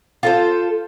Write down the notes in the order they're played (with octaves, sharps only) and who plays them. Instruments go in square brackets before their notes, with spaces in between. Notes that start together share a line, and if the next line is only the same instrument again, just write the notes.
[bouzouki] F4 A4 C5